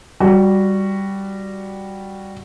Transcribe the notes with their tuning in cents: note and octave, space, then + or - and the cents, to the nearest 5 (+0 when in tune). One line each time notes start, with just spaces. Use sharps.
G3 +0 F#4 +0